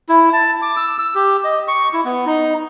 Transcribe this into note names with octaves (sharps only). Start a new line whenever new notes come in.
E4
A5
D6
E6
E6
G4
D#5
C#6
E4
B3
D#4